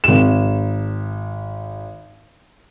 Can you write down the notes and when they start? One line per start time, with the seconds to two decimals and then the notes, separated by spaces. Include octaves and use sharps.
0.04 G#1 E7